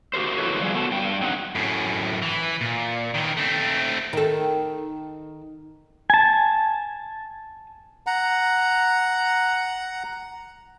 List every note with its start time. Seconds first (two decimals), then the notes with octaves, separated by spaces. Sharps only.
0.14 F#4 G4 A#4 C5
0.38 E4 F#4 G#4 A4 B4 C#5
0.60 F3 G3 G#4
0.74 B3 F#4 A4 A5
0.91 G2 G5
1.21 F#3 C4 D#4 F#5
1.55 F#2 A2
2.22 E3
2.61 A#2
3.14 D#3 E3
3.37 A3 C4
4.13 D#3 A4
6.10 G#5 A5
8.07 F#5 A#5